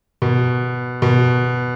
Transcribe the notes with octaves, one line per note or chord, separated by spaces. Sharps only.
B2
B2